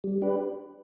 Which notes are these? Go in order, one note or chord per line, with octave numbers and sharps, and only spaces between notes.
G3
D4 G4 B4